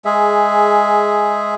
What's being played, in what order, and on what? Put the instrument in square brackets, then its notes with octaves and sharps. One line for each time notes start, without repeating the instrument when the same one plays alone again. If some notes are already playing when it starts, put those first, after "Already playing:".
[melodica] G#3 G#4 E5